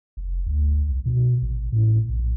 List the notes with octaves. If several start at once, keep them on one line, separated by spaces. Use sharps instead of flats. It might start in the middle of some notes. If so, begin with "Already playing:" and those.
F1
D2
C2
B2
A1
A2
A#1